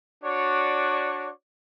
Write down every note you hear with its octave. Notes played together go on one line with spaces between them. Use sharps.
D4 F#4 C#5 D5